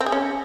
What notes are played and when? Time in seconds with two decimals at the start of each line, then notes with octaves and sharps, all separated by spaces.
0.01 C4
0.06 G#4
0.12 C#4